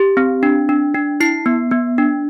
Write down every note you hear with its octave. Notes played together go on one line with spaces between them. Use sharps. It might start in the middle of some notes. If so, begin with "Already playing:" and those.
Already playing: G4
C4
D4
D4
D4
E4 C7
B3
B3
D4